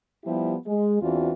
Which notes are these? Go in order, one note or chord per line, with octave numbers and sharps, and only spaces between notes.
F3 G3 B3 E4 G4
G#3
E2 E3 C4 D4 F4 F#4